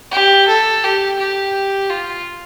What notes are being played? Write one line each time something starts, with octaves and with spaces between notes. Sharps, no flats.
G4
A4
G4
G4
F4